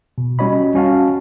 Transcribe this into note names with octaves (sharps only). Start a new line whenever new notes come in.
B2
G3 C#4 F#4 C#5 D#5 B5
C#4 F#4 F5 A5